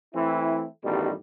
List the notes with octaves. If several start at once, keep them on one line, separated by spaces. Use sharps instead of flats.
E3 A3 C4 E4
A1 G2 B2 D#3 G3